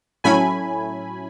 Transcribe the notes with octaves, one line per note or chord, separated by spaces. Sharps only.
A2 F#3 A3 C#4 E4 G#5 B5